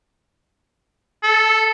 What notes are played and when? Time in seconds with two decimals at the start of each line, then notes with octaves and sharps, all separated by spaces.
1.23 A4